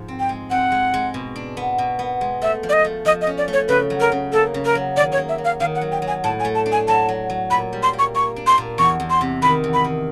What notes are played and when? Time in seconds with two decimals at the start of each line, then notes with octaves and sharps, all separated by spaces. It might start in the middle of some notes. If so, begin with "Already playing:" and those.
Already playing: G#2 F3
0.08 C4
0.20 G5
0.29 G#3
0.50 C4 F#5
0.72 G#3
0.94 G#3
1.14 B2
1.36 D4
1.57 B3
1.78 B2
1.99 B3
2.21 G#3
2.42 A3 E5
2.63 F3
2.69 D5
2.73 D#5
2.84 A3
3.05 F3 D#5
3.21 D#5
3.27 C#4
3.38 D5
3.48 A3
3.53 C#5
3.68 C#3 B4
3.90 F#3
4.00 A#4
4.12 C#3
4.33 A#3 A4
4.54 C#3
4.65 A#4
4.75 F#3
4.97 D#3 D5
5.12 C#5
5.18 A#3
5.29 E5
5.38 F#3
5.45 F5
5.60 D#3 F5
5.75 F#5
5.81 F#3
5.92 G5
6.02 F#3
6.07 G#5
6.24 A2 A5
6.40 G#5
6.45 A3
6.55 A5
6.66 D4
6.72 G#5
6.88 F#3 A5
7.09 F#3
7.30 F#3
7.51 A#2 B5
7.73 G3
7.83 C6
7.93 A#3
7.99 C#6
8.15 A#3 C#6
8.36 D4
8.47 C6
8.58 A#2
8.78 E2 C#6
9.00 E2
9.10 C6
9.21 C3
9.42 D#3 B5
9.64 E2
9.74 B5
9.84 D#3